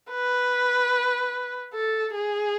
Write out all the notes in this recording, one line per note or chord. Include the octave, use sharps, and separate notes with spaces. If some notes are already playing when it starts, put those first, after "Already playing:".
B4
A4
G#4